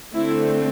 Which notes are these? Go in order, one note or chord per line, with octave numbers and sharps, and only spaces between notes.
D3 A3 C4 E4